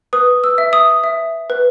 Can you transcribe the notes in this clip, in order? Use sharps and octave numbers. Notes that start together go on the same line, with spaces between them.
B4 D#6
E6
E5
D#6
E5
B4